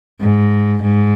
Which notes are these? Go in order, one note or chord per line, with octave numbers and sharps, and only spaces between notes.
G#2
G#2